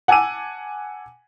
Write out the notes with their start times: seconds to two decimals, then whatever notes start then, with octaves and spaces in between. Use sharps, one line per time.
0.08 F#5 G#5 A5 D6 E6 D#7